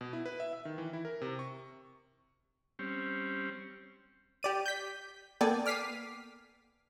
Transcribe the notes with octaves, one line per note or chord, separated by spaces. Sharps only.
B2
E4
B4
E5
E5
D#3
E3
E4
A#4
C3
C#6
G3 C4 C#4
G4 D5 D#7
G6 B6
A#3 B3 A4 D5 G5 G#5
D6 F6 B6 C7 D#7